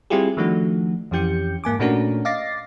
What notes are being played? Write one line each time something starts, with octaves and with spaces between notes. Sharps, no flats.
G3 C4 E4 F4 G4 G#4
D#3 F3 A3 D4 F#4
F2 E3 C#4 G4 G6 C#7
G#2 A#3 G#5 D6
A#2 A3 C#4 D4 F#4 A#4
D#5 F5 D6 A6 A#6 C7